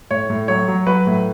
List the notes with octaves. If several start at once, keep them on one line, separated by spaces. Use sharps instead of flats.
A2 C#5
A2
F#3 C#5
F#3
F#3 B4
A2